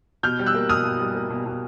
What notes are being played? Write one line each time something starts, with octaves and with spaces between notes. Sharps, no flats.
B2 F6 G6
G3
E6 F#6
A#3
B2 D#6 F6
B2
G3
A#3
B2
B2